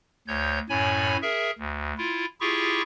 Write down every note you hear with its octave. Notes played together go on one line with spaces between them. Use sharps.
D2 C#5 G6
F#2 A2 C#5 G#5 B5
G#4 A#4 E5
D2
E4 F4
E4 F4 G4 G#4 C#6